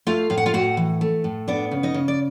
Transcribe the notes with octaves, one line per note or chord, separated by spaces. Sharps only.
A3 F4 F5
A2 F5
F#5
F4 F5
A2 F#4 F#5
E3
A3
A2
B3 D4 D5
C#3
D#4 D#5
C#3
D5